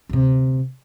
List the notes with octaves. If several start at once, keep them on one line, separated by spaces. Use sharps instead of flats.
D2 C3